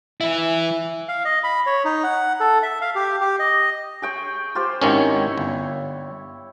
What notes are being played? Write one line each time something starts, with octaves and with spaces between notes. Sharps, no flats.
E3 E4
F5
D#5
B5
C#5
D#4
F#5
A4
E5
F5
G4
G4
D#5
G#4 G5 C#6
F4 G4 C5
G#1 D#3 C#4 E4 C#5
G1